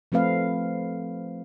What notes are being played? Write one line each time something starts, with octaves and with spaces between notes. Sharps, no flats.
F3 A3 C4 B4 F5